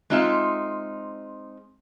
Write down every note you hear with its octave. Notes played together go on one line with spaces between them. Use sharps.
G#3 C4 D#4 F4 E5